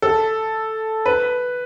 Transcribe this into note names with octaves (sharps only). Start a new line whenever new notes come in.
A4
B4